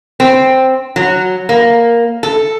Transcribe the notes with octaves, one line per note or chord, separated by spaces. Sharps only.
C4
F#3
A#3
A4